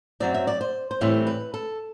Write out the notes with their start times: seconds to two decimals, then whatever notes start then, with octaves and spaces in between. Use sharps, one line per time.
0.20 F#2 F#3 C4 D5
0.34 E5
0.47 D5
0.61 C5
0.91 C5
1.01 A2 E3 G3 C4 B4
1.27 B4
1.54 A4